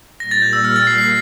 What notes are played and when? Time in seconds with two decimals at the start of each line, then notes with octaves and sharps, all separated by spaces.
0.19 A#2 G3 A#3 A#6
0.31 A6
0.42 G6
0.53 E6
0.64 F6
0.76 A6
0.87 C7
0.98 C7